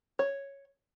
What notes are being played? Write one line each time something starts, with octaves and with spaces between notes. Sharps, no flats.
C#5